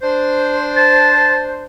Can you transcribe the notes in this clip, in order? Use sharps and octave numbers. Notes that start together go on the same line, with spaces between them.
D4 C5
A5